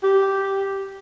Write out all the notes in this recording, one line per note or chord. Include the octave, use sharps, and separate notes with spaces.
G4